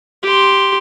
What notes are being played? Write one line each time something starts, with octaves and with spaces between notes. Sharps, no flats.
G4 C6